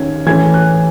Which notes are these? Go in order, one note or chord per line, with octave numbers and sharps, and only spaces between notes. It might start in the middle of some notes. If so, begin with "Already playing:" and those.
Already playing: D#3 C#4 G#6
E3 A3 C#4 G#6
F#6